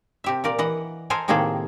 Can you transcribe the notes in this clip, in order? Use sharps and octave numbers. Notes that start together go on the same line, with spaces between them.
C3 G4 E5
A#2 A#4 D5
E3 D#5 F#5
A4 A#4 C5 D#5 G#5
A2 C3 D#3 A#3 G#4 A4